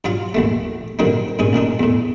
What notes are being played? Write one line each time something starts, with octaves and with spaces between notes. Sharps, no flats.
G2 F#3 F4
A#1 D#2 A3
G2 A#2 D3 D#3 F#3 C4
G2 A#2 G#3 C#4
A1 A#2 D4 D#4
E2 A2